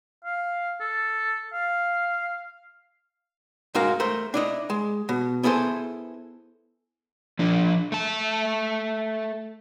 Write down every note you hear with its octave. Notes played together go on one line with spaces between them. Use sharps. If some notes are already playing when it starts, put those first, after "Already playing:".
F5
A4
F5
G#2 G#3 F#4 A#4 F5
A3 A#4 C5
D4 E4 D#5
G#3
B2
B3 E4 G#4 A4 C5
F3 D4
A3 A5